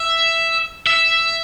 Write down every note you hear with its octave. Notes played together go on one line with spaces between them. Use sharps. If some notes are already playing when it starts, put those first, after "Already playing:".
Already playing: E5
E5